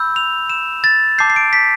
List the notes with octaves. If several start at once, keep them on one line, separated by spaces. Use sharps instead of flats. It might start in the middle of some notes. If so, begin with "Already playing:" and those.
Already playing: B5 E6 G6
F7
E7
A6
A5 D6 G6 C7
C7
D7
B6